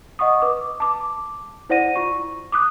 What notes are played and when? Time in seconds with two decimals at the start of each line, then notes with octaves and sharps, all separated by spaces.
0.19 D#5 F#5 C#6 D#6
0.42 B4 D6
0.80 A5 D6
1.70 E4 C5 D5 F#5 A#6 D#7
1.96 F4 C#6
2.52 D6 D#6 F#6